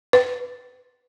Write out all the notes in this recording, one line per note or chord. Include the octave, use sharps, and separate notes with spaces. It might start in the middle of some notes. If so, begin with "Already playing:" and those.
B4